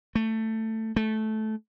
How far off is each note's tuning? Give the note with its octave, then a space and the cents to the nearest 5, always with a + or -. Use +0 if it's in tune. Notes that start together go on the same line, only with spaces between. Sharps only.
A3 +15
A3 -15